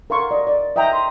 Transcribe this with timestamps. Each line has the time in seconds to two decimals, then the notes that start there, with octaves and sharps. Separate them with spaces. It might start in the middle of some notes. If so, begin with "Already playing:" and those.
0.10 A#4 F5 C6 C#6
0.31 D5 D#5
0.47 D5
0.76 D#5 E5 G5 A#5
0.93 C6